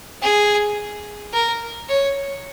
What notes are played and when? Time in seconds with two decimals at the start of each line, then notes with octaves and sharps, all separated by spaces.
0.22 G#4
1.33 A#4
1.89 C#5